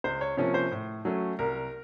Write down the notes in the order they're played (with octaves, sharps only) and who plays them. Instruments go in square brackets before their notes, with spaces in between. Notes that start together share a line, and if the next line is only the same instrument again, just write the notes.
[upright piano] C#2 C5
C#5
C3 F3 A#3 C#4 C#5
C5
A2
F#3 A3 C#4
C2 A#4